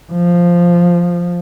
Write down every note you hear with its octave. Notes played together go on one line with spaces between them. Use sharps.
F3